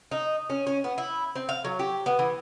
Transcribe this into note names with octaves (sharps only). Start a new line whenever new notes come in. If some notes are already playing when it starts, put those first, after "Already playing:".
D#4
C#4
C#4
B3
E4
C4
F5
F#3
G4
B3
E3